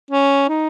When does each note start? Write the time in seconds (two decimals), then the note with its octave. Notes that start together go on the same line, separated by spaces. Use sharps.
0.11 C#4
0.49 D#4